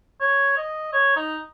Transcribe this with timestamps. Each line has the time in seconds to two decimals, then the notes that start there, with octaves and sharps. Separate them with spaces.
0.21 C#5
0.57 D#5
0.93 C#5
1.16 D#4